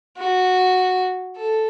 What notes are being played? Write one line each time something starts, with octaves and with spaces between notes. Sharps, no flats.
F#4
A4